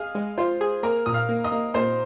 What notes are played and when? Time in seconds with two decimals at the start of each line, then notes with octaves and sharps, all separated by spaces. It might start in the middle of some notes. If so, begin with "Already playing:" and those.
Already playing: G#4 D#5 F5 F6
0.15 G#3
0.38 F4 C5 C6
0.61 G#4
0.83 A#3 A#4 A#5
1.06 A#2 D#6
1.14 F5 F6
1.29 A#3
1.44 D#5 D#6
1.52 A#3
1.74 A#2 C5 C6